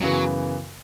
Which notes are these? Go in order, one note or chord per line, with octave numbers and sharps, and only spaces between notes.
F#2 C#3 E3 F#3 B3